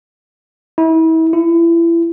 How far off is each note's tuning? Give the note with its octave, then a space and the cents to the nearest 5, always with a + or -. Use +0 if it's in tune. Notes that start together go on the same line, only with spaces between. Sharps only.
E4 -35
E4 +30